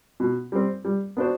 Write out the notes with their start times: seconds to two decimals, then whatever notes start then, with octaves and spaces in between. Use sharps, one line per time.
0.20 B2
0.52 G3 C4
0.85 G3
1.17 B3 D4 F#4 C5